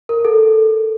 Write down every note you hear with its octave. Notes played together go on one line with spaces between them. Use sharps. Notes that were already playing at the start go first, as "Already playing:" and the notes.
A#4
A4